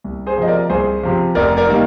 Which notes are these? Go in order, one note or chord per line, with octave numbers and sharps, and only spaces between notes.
C2
G#4 C5
C3 F3 D#5
A#4 D5
C2 G#4 C5
C3 F3
F1 A#4 D5
A#4 D5
D#3 G3 A#3